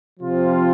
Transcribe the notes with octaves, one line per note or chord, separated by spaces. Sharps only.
C3 F3 C4 F4